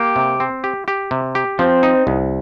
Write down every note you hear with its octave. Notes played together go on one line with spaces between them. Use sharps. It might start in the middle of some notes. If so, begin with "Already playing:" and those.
Already playing: A#3 G4
C3
C4
G4
G4
C3
G4
F3 C4
D#4
C2